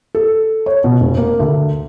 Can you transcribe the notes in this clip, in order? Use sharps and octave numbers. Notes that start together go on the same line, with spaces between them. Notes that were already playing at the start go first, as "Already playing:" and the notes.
A4
C#5
B2
F1
A#3
D2